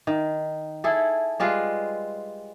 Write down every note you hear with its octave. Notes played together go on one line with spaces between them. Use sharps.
D#3
E4 G#4 A4
G3 G#3 F4 B4